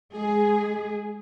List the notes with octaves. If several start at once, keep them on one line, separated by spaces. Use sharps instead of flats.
G#3 G#4